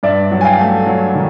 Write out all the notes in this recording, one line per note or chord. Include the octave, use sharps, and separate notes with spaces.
G2 D5 E5
F#3
G#5
F5 G5
A3
F#3
D#3